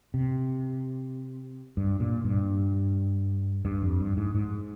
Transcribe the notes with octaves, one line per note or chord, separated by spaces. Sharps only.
C3
G2
A#2
G2
G2
F2
G2
G#2
G#2